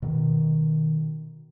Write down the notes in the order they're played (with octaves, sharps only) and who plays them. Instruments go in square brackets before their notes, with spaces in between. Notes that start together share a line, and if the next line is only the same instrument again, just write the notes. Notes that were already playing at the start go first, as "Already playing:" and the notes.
[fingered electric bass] B2 D#3